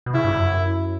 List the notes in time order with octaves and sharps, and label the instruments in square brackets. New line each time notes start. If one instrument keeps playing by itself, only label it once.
[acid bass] B2
[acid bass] C#3 [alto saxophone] E4
[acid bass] G2
F#2